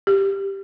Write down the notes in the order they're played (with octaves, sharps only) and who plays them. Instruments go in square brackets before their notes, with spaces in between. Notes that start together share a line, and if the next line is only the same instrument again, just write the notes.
[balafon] G4